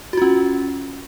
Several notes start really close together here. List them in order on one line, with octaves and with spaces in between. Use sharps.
F#4 F4 C#4